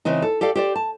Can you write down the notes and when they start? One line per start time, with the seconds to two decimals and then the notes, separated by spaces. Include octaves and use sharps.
0.05 C#3 E3 C4 D#4
0.22 A4
0.41 G4 A4 D5 F5
0.55 G4 C5 D5
0.76 A5